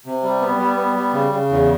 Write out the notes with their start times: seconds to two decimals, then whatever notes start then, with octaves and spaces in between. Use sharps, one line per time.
0.06 C3
0.23 G3
0.41 B3
0.60 G3
0.77 B3
0.96 G3
1.13 C#3
1.32 C#3
1.50 E2